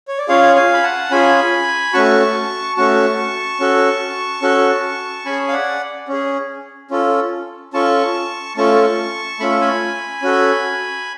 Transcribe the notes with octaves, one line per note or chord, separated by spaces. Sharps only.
C#5
D5
C#4 F4 G#4 C#5 F5
F5 G#5
B5
F#5 A5
C#4 F4 G#4 G#5 B5
A3 C#4 F#4 A5 C#6
A3 C#4 F#4 A5 C#6
C#4 F#4 A4
C#4 F#4 A4
C#4 G#4 G#5 B5
F5
D5 F#5
C#4 G#4
C#4 F4 A4
C#4 F4 A4 A5 C#6
A3 C#4 F4 A4 A5 C#6
A3 C#4 F4 A4 B5
C#6
G#5 B5
C#4 F#4 A4